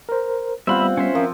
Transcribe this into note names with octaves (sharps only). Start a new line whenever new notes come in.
A#4 C5
G3 B3 C4 F4 E5 F#5 B5
C#4 C5 E5
F3 A#4